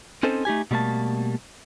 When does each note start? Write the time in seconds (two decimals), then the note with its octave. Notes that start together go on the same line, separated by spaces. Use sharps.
0.23 C4 C#4 D#4 A4 C5
0.45 A3 D#4 G4 G#5
0.71 B2 G3 A3 A#3 A5